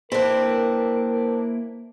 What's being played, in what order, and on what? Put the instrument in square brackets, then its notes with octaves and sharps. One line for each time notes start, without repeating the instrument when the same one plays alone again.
[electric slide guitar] A#3 E4 B4 [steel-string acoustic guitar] C4 D4 [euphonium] A#4